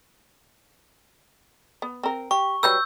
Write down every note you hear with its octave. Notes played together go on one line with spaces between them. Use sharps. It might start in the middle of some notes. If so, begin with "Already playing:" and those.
B3
C4 A#4
G4 C#6
F#3 G3 B4 E6 G6